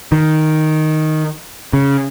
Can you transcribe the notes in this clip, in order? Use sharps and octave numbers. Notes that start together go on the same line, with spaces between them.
D#3
C#3